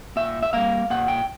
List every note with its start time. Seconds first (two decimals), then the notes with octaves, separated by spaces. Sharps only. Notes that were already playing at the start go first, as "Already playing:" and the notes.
0.16 A#2 E5
0.43 E5
0.53 G3 A#3 F5
0.90 A#2 F#5
1.08 G5